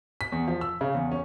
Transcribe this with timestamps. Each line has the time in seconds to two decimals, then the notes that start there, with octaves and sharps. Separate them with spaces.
0.21 B6
0.32 E2
0.48 F3
0.61 E6
0.81 C#3
0.95 E2
1.12 C#4